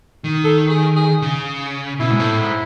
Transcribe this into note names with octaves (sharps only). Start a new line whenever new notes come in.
D#3
A4
G#4
G#4
C#3
B2 E4
G#2
A2
G#2